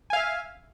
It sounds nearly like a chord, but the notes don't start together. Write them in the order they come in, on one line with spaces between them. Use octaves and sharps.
G#5 F5 E5